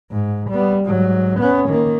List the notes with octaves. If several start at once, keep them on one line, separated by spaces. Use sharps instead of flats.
G#2
G3 B3
G#2 F#3
B3 C#4
D#3 A#3